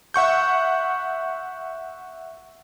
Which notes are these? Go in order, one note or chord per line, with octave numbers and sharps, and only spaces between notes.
E5 F#5 C#6 G6